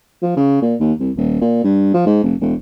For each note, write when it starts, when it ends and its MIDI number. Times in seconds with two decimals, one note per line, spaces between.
0.22 0.32 53
0.37 0.58 49
0.62 0.75 46
0.80 0.93 39
1.00 1.11 36
1.17 1.39 27
1.41 1.64 46
1.64 1.91 43
1.94 2.02 53
2.06 2.22 44
2.24 2.35 29
2.41 2.54 28